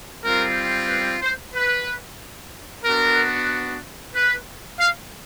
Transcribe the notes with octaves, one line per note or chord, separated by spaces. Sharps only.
G3 C4 F4 A#4
B4
C5
B4
B3 D4 F#4 A#4
B4
F5